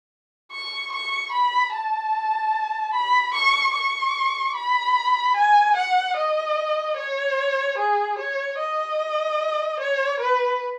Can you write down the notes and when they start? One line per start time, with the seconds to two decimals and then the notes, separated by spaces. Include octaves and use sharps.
0.52 C#6
0.92 C#6
1.32 B5
1.73 A5
2.93 B5
3.34 C#6
3.75 C#6
4.55 B5
5.36 G#5
5.76 F#5
6.16 D#5
6.97 C#5
7.78 G#4
8.18 C#5
8.58 D#5
9.80 C#5
10.20 B4